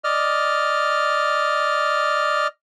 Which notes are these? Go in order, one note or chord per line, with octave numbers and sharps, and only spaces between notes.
D5 D#5 F6